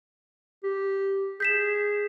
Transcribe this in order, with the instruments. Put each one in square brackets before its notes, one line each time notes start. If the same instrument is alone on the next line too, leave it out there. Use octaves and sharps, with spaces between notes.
[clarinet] G4
[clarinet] G#4 [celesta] G6 B6 E7